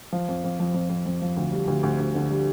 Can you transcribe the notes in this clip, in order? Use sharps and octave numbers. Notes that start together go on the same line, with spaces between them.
F3
F2
F2
F3
F2
F2
F2
F3
D2
G3
D2
D2
D2
D3
G3